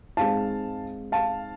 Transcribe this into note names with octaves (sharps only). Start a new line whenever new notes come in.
G#2 G#3 C4 F5 A5
F5 A5